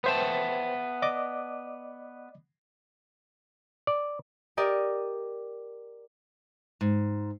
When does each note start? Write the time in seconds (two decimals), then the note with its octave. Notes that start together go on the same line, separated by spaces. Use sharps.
0.04 B3 B4 C5 E5 G5 A5
1.02 D5 D#5 D6
3.87 D5
4.57 G4 A#4 D5 D#5
6.81 G#2